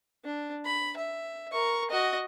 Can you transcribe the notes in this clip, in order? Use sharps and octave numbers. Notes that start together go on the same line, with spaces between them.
D4
B5
E5
A#4 C#6
F#4 D#5